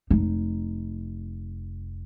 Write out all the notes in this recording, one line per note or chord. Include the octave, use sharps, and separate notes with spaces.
F1 D#4